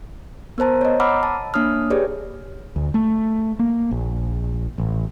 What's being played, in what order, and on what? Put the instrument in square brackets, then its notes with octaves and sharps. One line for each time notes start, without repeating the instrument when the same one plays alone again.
[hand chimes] B3 A#4 C5 A5 A#5
C#5 D#5
F#5 A#5 B5 D6 E6 F6
A5
A#3 D4 C#5 D#6 F6
G4 G#4 B4 C#5 D5
[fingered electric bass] D2
A3
A#3
A#1
A1